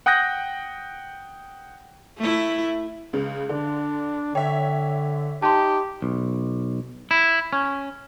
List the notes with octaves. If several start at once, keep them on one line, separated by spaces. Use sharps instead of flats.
F#5 G5 D#6 F#6 G6 A#6
A3 E4
C#2 C#3
D3 D4
D3 C#5 E5 G5
D#4 G4 A5 C6
B1
E4
C#4